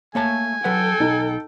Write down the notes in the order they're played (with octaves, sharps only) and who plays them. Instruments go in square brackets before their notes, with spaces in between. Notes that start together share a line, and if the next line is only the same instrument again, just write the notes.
[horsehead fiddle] A3 [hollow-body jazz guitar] A#3 C#5 A5 [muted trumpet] G#5
[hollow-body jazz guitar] F#3 B4 F#5 [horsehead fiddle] A4 G5
[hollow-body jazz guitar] B1 [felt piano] D#4